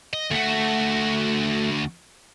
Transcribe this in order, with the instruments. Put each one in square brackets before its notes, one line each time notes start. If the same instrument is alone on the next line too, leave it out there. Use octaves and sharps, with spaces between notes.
[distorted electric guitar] D#5
[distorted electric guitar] D2 F#4 [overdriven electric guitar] A3